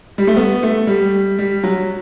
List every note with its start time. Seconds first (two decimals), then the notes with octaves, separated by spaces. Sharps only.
0.18 G3
0.27 A3
0.36 B3
0.63 A3
0.87 G3
1.39 G3
1.63 F#3